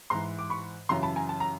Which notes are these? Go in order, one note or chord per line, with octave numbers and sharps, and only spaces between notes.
G#2 E3 A#5 C6
D6
B5 C#6
F#2 C#3 E3 A#5 C6
A5 B5
G#5 A#5
A5
A#5